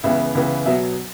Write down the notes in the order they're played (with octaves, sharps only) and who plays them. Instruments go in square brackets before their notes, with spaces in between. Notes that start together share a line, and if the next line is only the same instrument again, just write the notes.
[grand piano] C#2 C#3 E3 B3 E5
C#2 C#3 E3 B3
B2 F#3 B3 E5